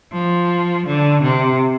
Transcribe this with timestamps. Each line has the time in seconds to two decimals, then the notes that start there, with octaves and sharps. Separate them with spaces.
0.13 F3
0.87 D3
1.23 C3